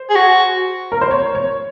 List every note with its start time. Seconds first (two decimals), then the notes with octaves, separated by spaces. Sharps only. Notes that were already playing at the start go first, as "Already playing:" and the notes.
Already playing: C5
0.10 G#4
0.15 F#4
0.92 A#4
1.01 C5
1.11 C#5
1.35 C#5